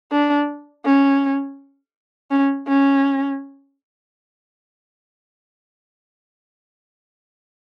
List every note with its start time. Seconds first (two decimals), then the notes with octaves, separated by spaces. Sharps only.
0.12 D4
0.85 C#4
2.31 C#4
2.68 C#4